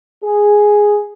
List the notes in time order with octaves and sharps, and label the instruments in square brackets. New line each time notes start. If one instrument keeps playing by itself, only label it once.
[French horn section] G#4